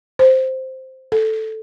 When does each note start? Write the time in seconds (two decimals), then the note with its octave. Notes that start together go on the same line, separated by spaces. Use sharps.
0.19 C5
1.12 A4